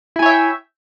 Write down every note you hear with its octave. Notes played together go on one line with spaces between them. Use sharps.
E4 C#5 E5 G5 G#5